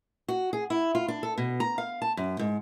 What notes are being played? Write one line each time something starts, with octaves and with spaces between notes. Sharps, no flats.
F#4
G#4
E4
F4
D4
A4
B2
A#5
F5
A5
F#2
G#2